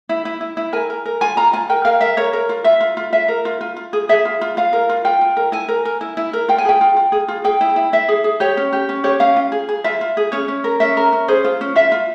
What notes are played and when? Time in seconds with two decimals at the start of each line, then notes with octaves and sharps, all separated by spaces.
0.09 E4
0.25 E4
0.41 E4
0.57 E4
0.73 A#4 G#5
0.90 A#4
1.05 A#4
1.21 F4 G#5
1.37 F4 A#5
1.53 F4 G#5
1.69 A#4 G5
1.85 A#4 F5
2.01 A#4 E5
2.17 A#4 C#5
2.33 A#4
2.49 F4
2.64 F4 E5
2.80 F4
2.97 F4
3.12 F4 E5
3.28 A#4
3.45 F4
3.61 F4
3.76 F4
3.93 G#4
4.09 G#4 E5
4.25 F4
4.41 F4
4.57 F4 F5
4.73 A#4
4.89 F4
5.05 F4 G5
5.21 F4
5.37 A#4
5.52 E4 G#5
5.68 A#4
5.85 A#4
6.01 E4
6.17 E4
6.33 A#4
6.48 F4 G5
6.58 G#5
6.65 G#4 G5
6.81 F4
6.97 F4
7.12 G#4
7.28 F4
7.44 G#4 G5
7.61 E4
7.76 E4
7.93 E4 E5
8.08 G#4
8.24 G#4
8.40 G4 C#5
8.57 C#4
8.73 G4
8.89 C#4
9.04 G4 C#5
9.20 C#4 F5
9.36 F4
9.52 G#4
9.69 G#4
9.84 F4 E5
10.01 F4
10.17 G#4
10.32 C#4 C#5
10.48 C#4
10.64 A#4
10.80 C#4 E5
10.97 A#4
11.13 C#4
11.28 G#4 C5
11.44 F4
11.61 C#4
11.76 F4 E5
11.92 F4